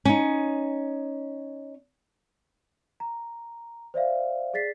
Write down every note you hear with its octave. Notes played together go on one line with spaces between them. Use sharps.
C#4 D#4
A#5
C5 D5 E5 F5
G#4 D5 A6 B6 C7